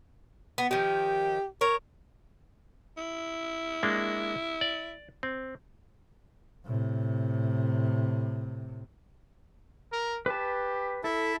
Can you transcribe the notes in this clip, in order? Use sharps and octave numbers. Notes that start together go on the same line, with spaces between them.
B3
D#3 F3 G4
A#4 C#5
E4
G#3 A#3 D4
D5
C4
A2 C3
A#4
G4 B4 A5
E4 A4 E5